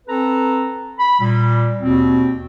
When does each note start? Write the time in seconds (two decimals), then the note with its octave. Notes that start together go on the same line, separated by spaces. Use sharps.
0.08 C4 A4 B4 A#5
0.99 B5
1.20 A#2 G3
1.80 D#2 B2 C4